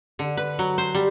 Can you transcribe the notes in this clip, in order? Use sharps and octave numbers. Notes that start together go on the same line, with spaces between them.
D3
B4
F#3
C5
G3